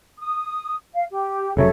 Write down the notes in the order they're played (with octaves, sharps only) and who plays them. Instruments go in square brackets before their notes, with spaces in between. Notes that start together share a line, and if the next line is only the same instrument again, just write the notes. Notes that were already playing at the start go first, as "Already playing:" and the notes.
[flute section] D#6
F5
G4
[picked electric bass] F1 C#3 F#3 [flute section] A4 C#5 E5